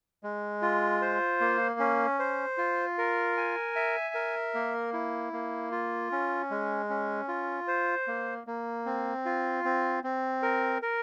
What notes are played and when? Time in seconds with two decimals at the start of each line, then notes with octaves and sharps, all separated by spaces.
0.23 G#3
0.62 F4
1.01 C5
1.41 A#3
1.80 C#4
2.19 C5
2.58 F4
2.98 A#4
3.37 G#5
3.76 E5
4.15 A#4
4.55 A#3
4.93 E4
5.33 A#3
5.72 F4
6.12 C#4
6.51 G#3
6.90 C#4
7.28 F4
7.68 C5
8.08 A#3
8.47 A#3
8.86 C4
9.25 F4
9.65 C4
10.04 C4
10.43 A#4
10.82 A#4